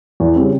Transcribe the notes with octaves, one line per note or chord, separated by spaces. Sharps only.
E2
C#3 G3 C4